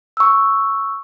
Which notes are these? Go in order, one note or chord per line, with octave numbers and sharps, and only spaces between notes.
C#6 E6